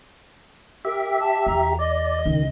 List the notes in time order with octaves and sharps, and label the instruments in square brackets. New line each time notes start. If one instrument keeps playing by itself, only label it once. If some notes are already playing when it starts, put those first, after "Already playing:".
[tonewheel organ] G4 E5 [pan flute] A#4
[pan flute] A5
[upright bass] E2 [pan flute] A#5
[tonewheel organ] D5 [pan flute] D#5
[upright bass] C#2 [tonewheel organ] D#3